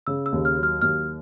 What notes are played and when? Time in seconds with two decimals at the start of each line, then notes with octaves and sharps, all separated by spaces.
0.07 C#3 E6
0.26 E6
0.32 D#2
0.45 F6
0.58 F#3
0.63 F6
0.81 D#2 F6